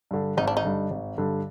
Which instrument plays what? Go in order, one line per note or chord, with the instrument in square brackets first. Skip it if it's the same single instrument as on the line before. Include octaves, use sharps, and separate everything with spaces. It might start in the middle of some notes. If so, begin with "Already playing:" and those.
[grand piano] G2 D3
[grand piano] G#1 [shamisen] D#4
[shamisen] D4
D#4
[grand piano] G2 D3
G#1
G2 D3